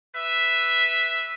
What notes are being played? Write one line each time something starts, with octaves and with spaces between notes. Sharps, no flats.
B4 E5